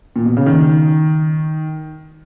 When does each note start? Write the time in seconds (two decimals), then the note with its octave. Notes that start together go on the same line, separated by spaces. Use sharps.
0.16 A#2
0.26 B2
0.37 C#3
0.46 D#3